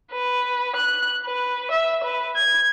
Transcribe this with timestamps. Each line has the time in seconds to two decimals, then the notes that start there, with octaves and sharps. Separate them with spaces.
0.12 B4
0.76 F#6
1.26 B4
1.71 E5
2.04 B4
2.36 G#6